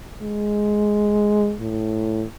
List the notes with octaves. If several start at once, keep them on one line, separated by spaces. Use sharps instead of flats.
G#3
A2